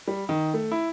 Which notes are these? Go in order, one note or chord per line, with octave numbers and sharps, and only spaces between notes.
G3
D#3
A3
E4